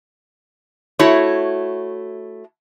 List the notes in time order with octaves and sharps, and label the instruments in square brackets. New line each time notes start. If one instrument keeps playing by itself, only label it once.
[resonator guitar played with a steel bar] A3 E4 F#4 C#5